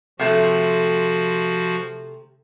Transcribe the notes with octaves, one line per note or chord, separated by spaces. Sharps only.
C3 F3 A3 F#4